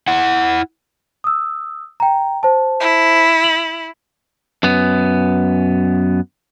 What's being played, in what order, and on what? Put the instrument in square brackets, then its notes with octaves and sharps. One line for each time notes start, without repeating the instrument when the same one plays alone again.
[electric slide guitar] E4 F#5
[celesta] D#6 E6
G5 A#5
C5 A5
[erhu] E4
[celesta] F#7
[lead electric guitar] F#2 B3